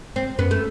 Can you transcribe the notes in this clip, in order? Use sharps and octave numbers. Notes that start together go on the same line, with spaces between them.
C4
F#2 B3
A3